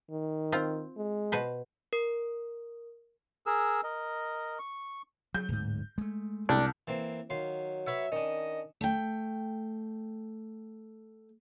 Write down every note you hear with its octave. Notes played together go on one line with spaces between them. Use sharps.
D#3
C4 F4
G#3
B2 B4 C5
A#4
G#4 A#4 E6
A#4 D#5
C#6
F#3 G6
D1 G#2
G#3 A3
C2 D4
E3 A#3 C4
D#3 F#3 F5 C6
B4 C#5 E5 F#5
D#3 C#4 D4 D#5
A3 G5